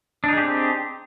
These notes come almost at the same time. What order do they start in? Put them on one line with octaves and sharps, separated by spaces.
D4 D#4 G#4 G4 C4